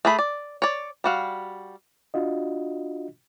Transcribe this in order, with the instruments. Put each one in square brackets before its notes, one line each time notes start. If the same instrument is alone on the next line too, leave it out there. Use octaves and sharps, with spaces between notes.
[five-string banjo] A3 G#4 B5
D5
C#5 D5
G3 F#4 F5
[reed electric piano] D4 F4 F#4 D#5